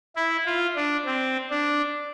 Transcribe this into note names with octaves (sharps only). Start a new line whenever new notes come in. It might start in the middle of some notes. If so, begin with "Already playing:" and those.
E4
F4
D4
C4
D4